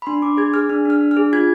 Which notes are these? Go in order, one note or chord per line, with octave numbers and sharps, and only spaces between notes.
B5
D4 C6
D4 D6
G#4 G#6
G#4 F6
D4 F6
D4 F6
D4
F6
G#4
F4 G#6